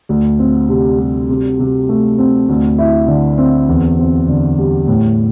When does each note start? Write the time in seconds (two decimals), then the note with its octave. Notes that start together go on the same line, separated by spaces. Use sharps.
0.09 D2
0.39 C4
0.69 C3
0.99 G3
1.29 C3
1.59 C3
1.89 A3
2.18 C4
2.49 D2
2.78 E4
3.08 D3
3.38 C4
3.69 E2
3.98 C4
4.28 D3
4.58 G3
4.88 A2